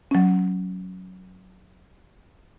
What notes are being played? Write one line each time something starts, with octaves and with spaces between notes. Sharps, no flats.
F#3 C#4